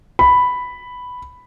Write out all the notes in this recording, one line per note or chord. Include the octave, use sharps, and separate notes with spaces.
B5